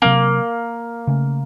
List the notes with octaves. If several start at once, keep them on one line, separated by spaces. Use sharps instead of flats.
C3 F#3 A#3 C4
C#3 A3 C#4